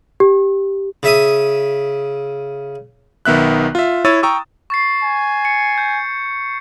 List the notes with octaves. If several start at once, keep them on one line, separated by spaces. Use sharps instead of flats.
G4
C#3 E5 D#6
B1 D#3 B3 E5 F#6
F4 E5
E4 C#5 E6 A6 D#7
G5 A#5 C#6 D#6 E6
C#6 A6 C7
G#5
C#7
G6